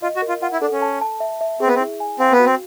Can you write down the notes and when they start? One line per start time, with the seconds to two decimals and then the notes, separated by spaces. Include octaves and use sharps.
0.02 F4 D#5
0.16 F#4
0.22 A#4
0.29 F4
0.42 F4 F#5
0.53 E4
0.62 D4 A4
0.72 C#4
0.82 A5
1.01 A5
1.20 E5
1.41 E5
1.60 C4 G#4
1.67 B3
1.75 C4
1.80 E4
2.00 G#5
2.19 C4 F5
2.32 B3
2.40 F#4
2.45 C4